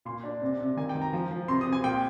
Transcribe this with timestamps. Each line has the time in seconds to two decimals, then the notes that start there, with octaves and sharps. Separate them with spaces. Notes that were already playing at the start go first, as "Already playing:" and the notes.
0.05 A#2 C6
0.24 D4
0.42 C3
0.60 C3
0.77 D#3 G#5
0.89 G5
0.95 D#3
1.02 A#5
1.13 F3
1.31 F3
1.48 C3 C6
1.61 D#6
1.67 C3
1.73 G#5
1.84 A#2 G5